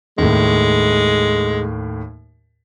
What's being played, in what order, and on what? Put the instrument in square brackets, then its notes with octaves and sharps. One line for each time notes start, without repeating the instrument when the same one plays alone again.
[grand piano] D#2 A2 [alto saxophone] G#3